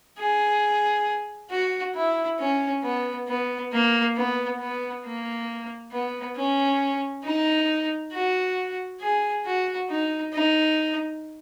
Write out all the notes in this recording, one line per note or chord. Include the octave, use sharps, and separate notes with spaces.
G#4
F#4
E4
C#4
B3
B3
A#3
B3
B3
A#3
B3
C#4
D#4
F#4
G#4
F#4
D#4
D#4